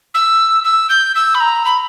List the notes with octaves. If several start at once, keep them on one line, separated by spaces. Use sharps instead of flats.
E6
E6
G6
E6
B5
A#5
B5